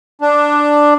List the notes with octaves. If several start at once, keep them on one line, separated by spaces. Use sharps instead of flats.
D4